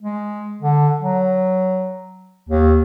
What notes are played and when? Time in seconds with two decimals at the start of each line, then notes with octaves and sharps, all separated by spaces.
0.01 G#3
0.62 D3
1.00 F#3
2.49 D#2